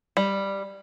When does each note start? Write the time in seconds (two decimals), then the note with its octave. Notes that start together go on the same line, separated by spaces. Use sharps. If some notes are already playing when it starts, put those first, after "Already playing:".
0.17 G3